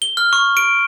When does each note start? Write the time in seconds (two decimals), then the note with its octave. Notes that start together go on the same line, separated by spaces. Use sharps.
0.02 G7
0.17 F6
0.33 C#6
0.57 D7